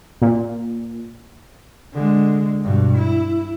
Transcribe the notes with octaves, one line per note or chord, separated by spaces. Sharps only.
A#2
D3 G#3
G2 B2
E4